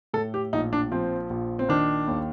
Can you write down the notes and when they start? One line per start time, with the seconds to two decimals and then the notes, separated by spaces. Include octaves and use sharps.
0.14 A2 A4
0.34 G4
0.53 A#1 D#4
0.73 D4
0.92 F3 C4
1.30 A#1
1.59 C4
1.69 D#3 D4
2.08 D#2